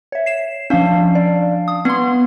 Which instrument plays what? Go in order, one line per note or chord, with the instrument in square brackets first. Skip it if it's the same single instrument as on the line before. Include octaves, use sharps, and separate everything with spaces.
[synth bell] C#5 E5
C7 E7
[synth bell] F3 C#4 [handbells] D4 F5
[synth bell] D5
D#6
[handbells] B3 [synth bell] F#5 C6